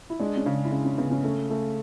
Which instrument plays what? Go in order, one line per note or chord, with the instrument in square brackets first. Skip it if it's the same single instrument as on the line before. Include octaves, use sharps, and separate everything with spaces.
[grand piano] E4
[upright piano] G#3 [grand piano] D4
[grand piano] C#4
[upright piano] C#3
[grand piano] E4
[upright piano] C#3 [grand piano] D4
[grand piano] C#4
[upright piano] C#3 [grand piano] B3
[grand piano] C#4
[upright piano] A3
A3